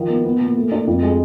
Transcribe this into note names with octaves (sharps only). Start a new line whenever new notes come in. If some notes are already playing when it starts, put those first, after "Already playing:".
Already playing: D#3 F3
B3
B3
A#2
A3
D4
F2
G#3